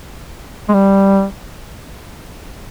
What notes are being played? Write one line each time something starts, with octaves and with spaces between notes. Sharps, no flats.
G#3
G3